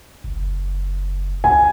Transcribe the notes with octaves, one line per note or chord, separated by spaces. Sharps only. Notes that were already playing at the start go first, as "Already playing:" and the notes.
F#1
C#2 G#5